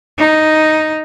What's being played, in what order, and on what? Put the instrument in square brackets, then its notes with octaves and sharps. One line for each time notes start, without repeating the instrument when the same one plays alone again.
[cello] D#4